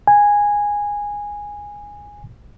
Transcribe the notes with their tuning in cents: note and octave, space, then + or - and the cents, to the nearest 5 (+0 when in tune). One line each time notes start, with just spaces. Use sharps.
G#5 -10